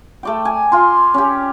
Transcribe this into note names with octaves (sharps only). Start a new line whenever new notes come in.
A3 D5 G5
G#5
F4 C6
C#4 G4